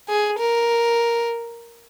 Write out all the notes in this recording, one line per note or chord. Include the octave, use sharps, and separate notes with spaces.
G#4
A#4